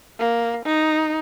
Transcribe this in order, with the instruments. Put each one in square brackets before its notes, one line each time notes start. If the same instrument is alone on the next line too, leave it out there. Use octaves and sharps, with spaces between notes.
[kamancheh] A#3
D#4